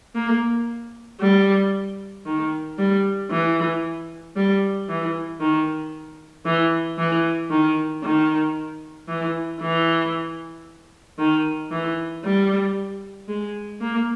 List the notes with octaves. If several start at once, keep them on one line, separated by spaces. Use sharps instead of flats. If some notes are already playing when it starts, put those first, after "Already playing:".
A#3
G3
D#3
G3
E3
G3
E3
D#3
E3
E3
D#3
D#3
E3
E3
D#3
E3
G3
G#3
A#3